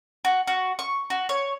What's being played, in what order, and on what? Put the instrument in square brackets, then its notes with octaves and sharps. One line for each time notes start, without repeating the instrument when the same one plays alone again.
[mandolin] F#4
F#4
C#6
F#4
C#5